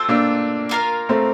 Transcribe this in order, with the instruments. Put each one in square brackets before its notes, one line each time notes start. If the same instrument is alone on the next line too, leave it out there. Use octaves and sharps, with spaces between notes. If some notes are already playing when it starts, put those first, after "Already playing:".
Already playing: [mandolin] A3 C4 F4 C5
[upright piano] A#3 D4
[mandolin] A#3 F4 A#4 F5
[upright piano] A3 C4